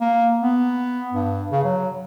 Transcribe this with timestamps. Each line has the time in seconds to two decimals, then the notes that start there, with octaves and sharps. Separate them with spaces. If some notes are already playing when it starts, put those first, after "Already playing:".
0.01 A#3
0.42 B3
1.14 G2
1.51 C#3
1.64 F#3